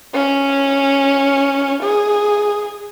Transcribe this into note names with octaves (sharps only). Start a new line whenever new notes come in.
C#4
G#4